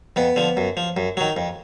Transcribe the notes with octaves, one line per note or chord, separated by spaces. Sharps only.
F2 B3
D3 F3
F#2
F3
F#2
D#3 F#3
F2